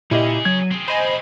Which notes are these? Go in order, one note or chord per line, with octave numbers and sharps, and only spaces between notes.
A#2 C#4 E4 G4 G#4 D#5
F#3 G#6
C4 G#4
C5 D#5 G#5 B5